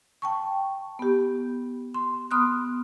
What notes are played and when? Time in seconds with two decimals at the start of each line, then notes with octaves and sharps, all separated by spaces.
0.22 G5 A5 C#6
0.99 B3 G4
1.94 C6
2.31 B3 C6 D#6 F6 F#6